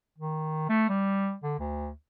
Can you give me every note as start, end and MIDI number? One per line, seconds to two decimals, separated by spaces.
0.18 0.66 51
0.69 0.86 57
0.89 1.34 55
1.43 1.58 50
1.59 1.90 38